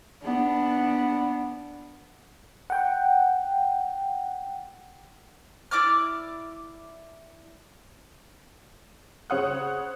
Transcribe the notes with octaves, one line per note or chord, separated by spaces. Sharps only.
B3 D4
F#5 G5
E4 D5 D6 F6
C#3 C5 C#5 F#5 D#6 F#6